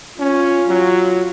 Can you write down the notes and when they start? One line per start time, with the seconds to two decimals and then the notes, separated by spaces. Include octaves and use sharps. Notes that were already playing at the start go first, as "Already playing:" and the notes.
0.20 C#4 F4
0.69 F#3